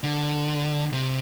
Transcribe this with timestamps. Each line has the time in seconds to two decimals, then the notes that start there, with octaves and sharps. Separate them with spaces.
0.03 D3
0.93 C3